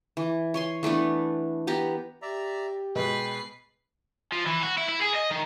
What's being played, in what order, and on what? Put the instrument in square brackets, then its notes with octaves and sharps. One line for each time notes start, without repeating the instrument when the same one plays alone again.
[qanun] E3
C#5 G#5 C6
E3 A3 B3 D4
B3 G4 A#5
[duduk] G4 [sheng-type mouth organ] D5 E5 A#5
[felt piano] B2 G#3 [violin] B4 C7 [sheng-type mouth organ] G5
[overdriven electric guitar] F3
E3
F#4
E4
E4
G#4
D#5
D#3